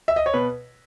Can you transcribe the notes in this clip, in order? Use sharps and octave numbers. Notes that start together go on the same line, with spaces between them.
E5
D#5
C#5
B2 B4